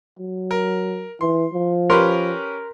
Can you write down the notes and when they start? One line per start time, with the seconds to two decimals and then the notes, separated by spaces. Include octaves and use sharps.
0.19 F#3
0.51 A#4
1.21 E3 C6
1.53 F3
1.90 C#4 G4 A#4 B4 C6